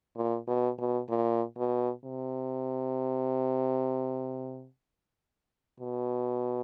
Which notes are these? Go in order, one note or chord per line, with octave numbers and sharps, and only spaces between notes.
A#2
B2
B2
A#2
B2
C3
B2